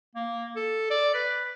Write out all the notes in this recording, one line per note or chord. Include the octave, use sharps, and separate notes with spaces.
A#3
A4
D5
B4